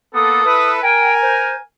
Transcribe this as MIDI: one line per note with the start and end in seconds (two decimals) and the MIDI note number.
0.14 0.44 58
0.14 0.44 59
0.14 0.44 69
0.14 0.71 87
0.45 0.78 64
0.45 0.78 69
0.45 0.78 71
0.82 1.61 70
0.82 1.13 79
0.82 1.61 80
1.21 1.55 72